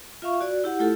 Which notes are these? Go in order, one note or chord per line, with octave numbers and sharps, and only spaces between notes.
F4 E5 F5 C#6
F#4 D5
E4 G4 F#5
A3 E4 F4 G4 A4